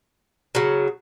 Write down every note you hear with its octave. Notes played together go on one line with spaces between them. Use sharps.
C#3 F#3